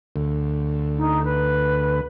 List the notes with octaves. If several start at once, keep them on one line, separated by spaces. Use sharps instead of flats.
D2
D#4
B4